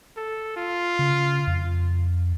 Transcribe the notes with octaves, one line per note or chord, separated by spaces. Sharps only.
A4
F4
C#3
F2